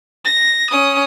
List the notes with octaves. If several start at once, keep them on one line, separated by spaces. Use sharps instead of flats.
A#6
C#4 D#6